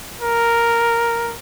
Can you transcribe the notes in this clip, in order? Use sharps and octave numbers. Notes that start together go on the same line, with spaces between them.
A#4